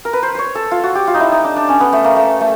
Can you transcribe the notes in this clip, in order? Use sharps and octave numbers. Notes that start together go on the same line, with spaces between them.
A#4
B4
C5
C5 C#5
A4
F4
F#4
G4
F4
D#4
E4
D#4
D4
D4
C#4
B3
A3
A#3
A3
A3